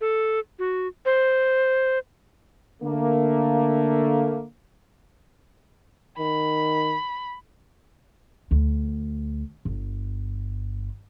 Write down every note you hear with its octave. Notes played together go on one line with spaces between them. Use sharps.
A4
F#4
C5
D3 A3 A#3
D#3 B5
D2
G1